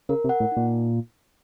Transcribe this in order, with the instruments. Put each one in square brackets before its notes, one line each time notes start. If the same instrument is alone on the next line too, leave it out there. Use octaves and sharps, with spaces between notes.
[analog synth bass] C#3 [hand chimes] A#4
[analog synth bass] C3
[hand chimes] F#5
[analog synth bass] A2
[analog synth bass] A#2 [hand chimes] D#4